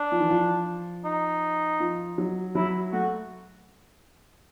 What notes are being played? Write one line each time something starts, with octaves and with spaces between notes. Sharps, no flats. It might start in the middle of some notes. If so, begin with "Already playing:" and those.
Already playing: D4
F3
E3
F3
D#4
F3
F#3
F#3 E4
A3 F#4